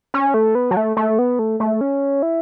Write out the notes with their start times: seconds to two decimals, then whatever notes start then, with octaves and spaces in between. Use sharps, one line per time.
0.14 C#4
0.34 A3
0.55 B3
0.71 F#3
0.77 A3
0.97 A3
1.19 B3
1.39 A3
1.60 A3
1.81 C#4
2.22 E4